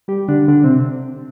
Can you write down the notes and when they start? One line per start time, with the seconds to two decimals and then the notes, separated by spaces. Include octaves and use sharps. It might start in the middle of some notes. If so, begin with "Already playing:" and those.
0.08 G3 G4
0.28 D3 D4
0.49 D3 D4
0.64 C3 C4